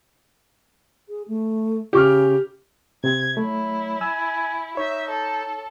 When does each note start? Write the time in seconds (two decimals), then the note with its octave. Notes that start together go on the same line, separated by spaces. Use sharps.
1.09 G#4
1.28 A3
1.93 C#3 G4 D6 F6
3.04 C3 C4 G#6
3.37 F#3 A3 E4
4.01 G#5 E6
4.77 D#4 C#5 E5
5.10 A4